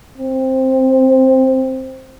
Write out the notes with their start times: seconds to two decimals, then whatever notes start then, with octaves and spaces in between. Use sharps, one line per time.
0.18 C4